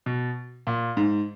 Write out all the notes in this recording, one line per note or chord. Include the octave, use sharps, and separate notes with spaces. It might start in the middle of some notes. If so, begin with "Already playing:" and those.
B2
A#2
G#2